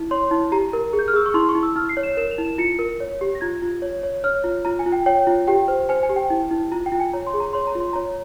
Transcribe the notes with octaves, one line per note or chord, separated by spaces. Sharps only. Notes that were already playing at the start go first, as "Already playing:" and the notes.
Already playing: E4
C#5 C6
E4
G4 A#5
A#4
G#4
G6
F6
G#4 E6
C#6
E4 C6
C#6
E4
E6
E4 F6
C7
C#5
E7
A#4 E7
F7
E4
E7
F4 C#7
A#4
C#5
G4
A#6
F4 G#6
F4
C#5
C#5
C#5 F6
F4
F4 A#5
G#5
F4
G5
C#5 G5
F4
G4 G5
C5
C5 G#5
G#5
G4
G5
E4
E4
F4 A#5
G5
F4
G#5
C#5 A#5
C6
G#4
A#5
C#5 C6
A#5
F4
C6
C#5 A#5